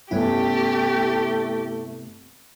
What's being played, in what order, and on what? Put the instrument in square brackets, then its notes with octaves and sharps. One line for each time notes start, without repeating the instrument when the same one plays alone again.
[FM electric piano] G2 E4 [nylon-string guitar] C3 B3 C#4 [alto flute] A3 [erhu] G4